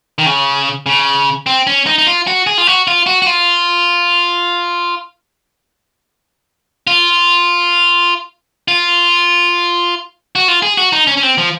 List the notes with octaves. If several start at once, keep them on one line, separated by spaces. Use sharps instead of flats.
D#3
C#3
C#3
C4
C#4
D#4
D#4
F4
F#4
G#4
F4
F#4
F4
F#4
F#4
F4
F4
F4
F#4
F4
G#4
F#4
D#4
C#4
C#4
C4
F3